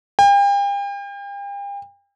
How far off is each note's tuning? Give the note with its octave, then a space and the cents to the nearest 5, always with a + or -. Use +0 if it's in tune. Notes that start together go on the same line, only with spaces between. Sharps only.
G5 +40